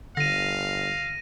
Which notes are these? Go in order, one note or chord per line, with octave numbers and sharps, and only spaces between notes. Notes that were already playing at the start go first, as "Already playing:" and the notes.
G1 D3 F5 A#6 D#7